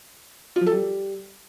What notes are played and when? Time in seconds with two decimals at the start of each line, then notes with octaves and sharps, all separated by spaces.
0.56 F4
0.61 F3
0.66 A4
0.72 G3